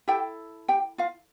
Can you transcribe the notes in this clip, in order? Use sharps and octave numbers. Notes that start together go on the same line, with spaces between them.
E4 G4 A4 G5
G4 G5
F4 F5